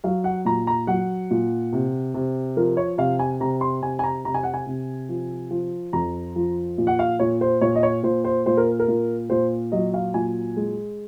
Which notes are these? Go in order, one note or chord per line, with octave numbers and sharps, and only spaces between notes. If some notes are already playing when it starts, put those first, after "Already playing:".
F#3 F5
F#5
A#2 A#5
A#5
F#3 F#5
A#2
C3
C3
F3 A#4
C#5
C3 F5
G#5
C3 A#5
C6
C3 G#5
G#5
A#5
C3 A#5
G#5
F#5
G#5
C3
F3
F3
F2 A#5
F3
A#2
F#5
F5
A#2 C#5
C5
A#2 C#5
D#5
C#5
A#2 C5
C5
A#2 C5
A#4
A#4
A#2
A#2 C5
F#3 D#5
F5
A#2 G#5
G#3